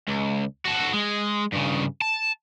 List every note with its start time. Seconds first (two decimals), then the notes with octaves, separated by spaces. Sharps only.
0.08 C#2
0.65 F#4 A4
0.94 G#3
1.52 G2 C#3
2.02 A5